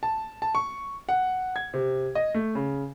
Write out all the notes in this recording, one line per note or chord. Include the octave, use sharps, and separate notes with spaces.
A5
A5
C#6
F#5
G#6
C3
D#5
A3
C#3